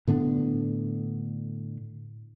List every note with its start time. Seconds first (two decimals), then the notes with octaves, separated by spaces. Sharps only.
0.07 A2 D3 B3 D4